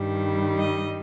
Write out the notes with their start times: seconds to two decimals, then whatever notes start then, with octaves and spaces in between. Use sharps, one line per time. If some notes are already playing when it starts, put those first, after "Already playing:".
Already playing: G2 D#3 G3
0.59 D#5